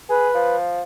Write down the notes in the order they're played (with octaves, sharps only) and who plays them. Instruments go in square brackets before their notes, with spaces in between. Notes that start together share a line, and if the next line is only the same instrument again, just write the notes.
[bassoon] G#4 [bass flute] B4
[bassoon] F3